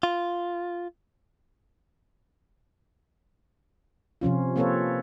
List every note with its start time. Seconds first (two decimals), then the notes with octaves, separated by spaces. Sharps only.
0.03 F4
4.21 C3 F3 C#4 F4
4.56 A#3 C4 F4 A4 B4 C#5